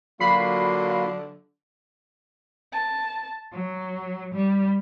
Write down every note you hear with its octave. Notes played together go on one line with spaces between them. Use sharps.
D3 F#3 A#3 F4 F#4 B5 C7
A5
F#3
G3